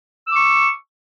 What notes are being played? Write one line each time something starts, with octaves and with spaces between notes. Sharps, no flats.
C#6 D6 E6